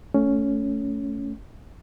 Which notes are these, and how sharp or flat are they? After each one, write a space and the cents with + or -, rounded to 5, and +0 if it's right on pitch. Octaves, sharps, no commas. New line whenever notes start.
A3 +0 C#4 +10